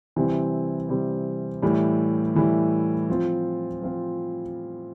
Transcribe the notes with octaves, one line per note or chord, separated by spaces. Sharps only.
C3 E3 G3 C4
C3 E3 G3 C4
A2 E3 G3
A2 E3 G3
F3 C4 F4
F3 C4 F4